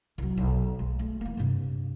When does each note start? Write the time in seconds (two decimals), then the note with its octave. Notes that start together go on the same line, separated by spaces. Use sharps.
0.18 C2 F#3
0.37 B1
0.79 G#3
0.99 A3
1.21 E3 A#3
1.37 G2 C3